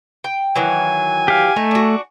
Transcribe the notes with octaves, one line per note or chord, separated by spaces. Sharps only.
G5
D#3 E3 F#3 G#5
G4 F5
A3 D#4
D4 F#4